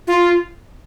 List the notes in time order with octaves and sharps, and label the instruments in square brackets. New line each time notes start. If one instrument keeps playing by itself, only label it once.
[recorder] F4